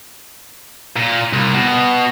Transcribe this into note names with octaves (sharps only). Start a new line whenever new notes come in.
A#2
C2
B2